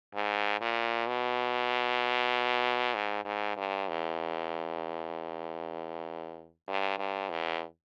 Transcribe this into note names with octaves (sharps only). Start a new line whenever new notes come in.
G#2
A#2
B2
G#2
G#2
G2
E2
G2
G2
E2